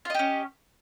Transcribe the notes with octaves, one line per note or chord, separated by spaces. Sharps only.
C#4 F4 G4 D#5